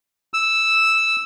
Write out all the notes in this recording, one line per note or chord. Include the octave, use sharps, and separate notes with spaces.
E6